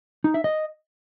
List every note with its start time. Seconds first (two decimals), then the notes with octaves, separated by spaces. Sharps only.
0.24 D#4
0.34 E5
0.44 D#5